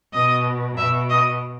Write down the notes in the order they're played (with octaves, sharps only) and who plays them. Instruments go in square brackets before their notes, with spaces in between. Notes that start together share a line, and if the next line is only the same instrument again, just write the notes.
[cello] B2 [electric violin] D#5
[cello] B2 [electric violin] E5
[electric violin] D#5